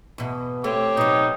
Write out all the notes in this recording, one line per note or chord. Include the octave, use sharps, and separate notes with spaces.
E2 B2
A3 C4 G4 C#5
B2 F#3 D#4